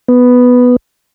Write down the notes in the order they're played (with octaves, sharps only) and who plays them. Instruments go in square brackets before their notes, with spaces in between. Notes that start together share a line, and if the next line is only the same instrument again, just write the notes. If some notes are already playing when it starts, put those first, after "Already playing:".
[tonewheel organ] B3